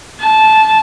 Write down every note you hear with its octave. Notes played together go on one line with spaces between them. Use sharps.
A5